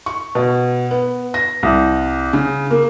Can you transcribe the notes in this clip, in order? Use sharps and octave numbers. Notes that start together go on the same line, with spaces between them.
C#6
B2
B3
A#6
C2
C#3
A#3